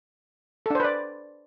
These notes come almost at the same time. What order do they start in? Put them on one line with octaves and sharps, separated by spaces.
A4 D4 C5 B4 D5